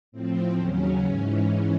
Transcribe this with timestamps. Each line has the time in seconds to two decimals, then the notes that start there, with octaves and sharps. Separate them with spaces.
0.12 A2 F3 C4
0.58 D#2 C#3 F#3 C#4
1.04 G#2 E3